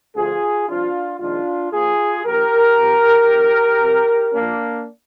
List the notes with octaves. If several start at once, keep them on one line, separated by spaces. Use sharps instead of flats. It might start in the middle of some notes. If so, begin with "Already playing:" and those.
D2 D3 F3 F4 G#4
C2 C3 F3 D4 F4
A#1 G#2 D#3 D4 F4
A#1 A#2 F3 F4 G#4
A#1 A#2 F3 G4 A#4
C2 C3 F3
F2 D#3
C2 C3 F3
A#1 A#2 F3 A#3 D4